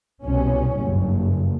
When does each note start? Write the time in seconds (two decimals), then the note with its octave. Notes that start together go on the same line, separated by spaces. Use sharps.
0.23 C2 B2 C#4
0.80 F#1 G2